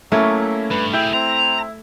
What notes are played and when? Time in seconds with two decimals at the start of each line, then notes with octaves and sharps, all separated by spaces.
0.12 F#3 A3 A#3 C#4 E4
0.71 G2 B4
0.93 C4 E4 G#4 G5
1.14 C4 A#5